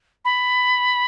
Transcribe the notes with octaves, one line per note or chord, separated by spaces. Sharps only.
B5